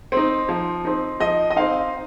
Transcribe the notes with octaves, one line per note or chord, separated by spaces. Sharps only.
C4 D#4
F3
C4 D#4
F3 D#5
D#5
C4 D#4 F5